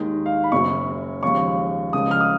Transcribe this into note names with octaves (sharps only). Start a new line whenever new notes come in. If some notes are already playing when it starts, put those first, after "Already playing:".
Already playing: D#2 D#3 G#3
F5
B5
F#1 F#2 C#3 F#3 C#6
D#2 C#3 F3 G#3 C#6
C#2 C#3 F3 G#3 D#6
F6
D#6